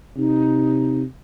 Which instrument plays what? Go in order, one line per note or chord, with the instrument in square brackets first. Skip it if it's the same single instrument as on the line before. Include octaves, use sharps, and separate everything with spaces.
[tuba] C3 [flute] D#4